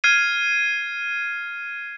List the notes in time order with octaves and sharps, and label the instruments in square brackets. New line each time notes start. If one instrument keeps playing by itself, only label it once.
[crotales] F6 G#6 C7 D#7